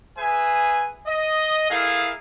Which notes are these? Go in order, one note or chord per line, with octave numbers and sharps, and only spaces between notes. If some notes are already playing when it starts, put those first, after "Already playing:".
G#4 B4 E5 G#5
D#5
A3 E4 G#4 A#4 F5